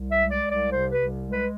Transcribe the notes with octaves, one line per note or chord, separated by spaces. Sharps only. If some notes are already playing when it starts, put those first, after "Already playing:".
Already playing: C2
E5
G#3
D5
C2
D5
C3 C5
B4
C2
G#3
B4